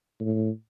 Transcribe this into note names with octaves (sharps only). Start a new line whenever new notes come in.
A2